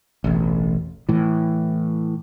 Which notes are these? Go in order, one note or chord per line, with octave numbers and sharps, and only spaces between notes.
E1 A1
A2 E3